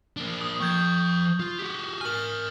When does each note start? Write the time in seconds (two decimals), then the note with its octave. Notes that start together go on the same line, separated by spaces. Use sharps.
0.17 A#3 D4
0.41 D#6
0.60 F3 G5 C#6 G6 G#6
1.40 F4
1.59 F#4 G4
2.01 A#4 G#5 F6 F#7